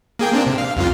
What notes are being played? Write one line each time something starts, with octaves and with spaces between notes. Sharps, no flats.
A#3 G#4 G5
A#3 C4 D4
C3
F5
C2 F2 F4